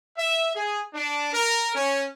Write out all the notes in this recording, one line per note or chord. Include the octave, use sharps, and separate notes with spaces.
E5
G#4
D4
A#4
C#4